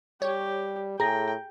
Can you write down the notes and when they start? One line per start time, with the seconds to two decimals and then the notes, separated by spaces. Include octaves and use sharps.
0.22 G3 G4 C#5
1.00 A2 G#4 G5 A#5 A#6